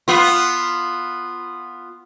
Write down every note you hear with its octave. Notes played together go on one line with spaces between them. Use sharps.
B3 F4